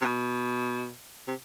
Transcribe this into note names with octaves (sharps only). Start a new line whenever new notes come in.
C3
B2
C3